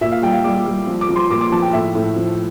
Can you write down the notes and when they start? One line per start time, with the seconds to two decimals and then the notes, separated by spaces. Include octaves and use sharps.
0.01 A#2 E5
0.12 F5
0.22 G3 G5
0.33 F5
0.44 G3 D6
0.66 G3
0.87 F3
1.01 D6
1.09 F3
1.16 C6
1.30 A#2 D6
1.41 D6
1.52 F3 A5
1.62 G5
1.73 A2 E5
1.95 A2
2.16 F3